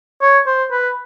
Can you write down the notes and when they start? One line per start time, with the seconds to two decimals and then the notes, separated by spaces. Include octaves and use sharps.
0.22 C#5
0.47 C5
0.72 B4